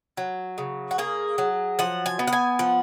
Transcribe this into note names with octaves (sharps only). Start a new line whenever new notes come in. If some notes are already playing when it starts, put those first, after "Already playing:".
F#3
C#3
F#4
A#3 G#4
F#3
F3 F#5
G#5
B3
F#5
G#5
F3 F#5